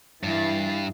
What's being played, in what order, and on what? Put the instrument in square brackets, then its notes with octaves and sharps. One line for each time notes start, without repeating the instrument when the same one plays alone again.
[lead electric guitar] G2 [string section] E3 A6 C7